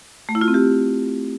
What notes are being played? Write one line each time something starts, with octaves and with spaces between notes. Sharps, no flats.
A3
E4
F4
C4
G4